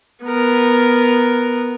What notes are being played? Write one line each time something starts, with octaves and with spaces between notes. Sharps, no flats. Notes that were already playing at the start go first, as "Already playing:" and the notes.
B3 A#4